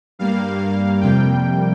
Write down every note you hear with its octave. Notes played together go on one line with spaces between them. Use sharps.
G2 G3 A#3 F5
F2 C3 G3 A#3 G5